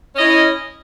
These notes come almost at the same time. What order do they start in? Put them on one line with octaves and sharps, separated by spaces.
C#4 D#5 E4